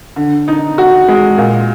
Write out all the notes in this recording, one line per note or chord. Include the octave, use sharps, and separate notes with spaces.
D3
D#4
F#4
G#3
A#2